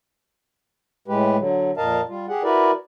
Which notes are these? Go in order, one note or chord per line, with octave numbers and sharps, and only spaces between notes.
A2 G#3 G4 B4
D3 F#3
F2 A#2 A#4 D#5 F5 A5
G3 F4
G4 G#4 F#5
E4 F#4 A#4 B4 D5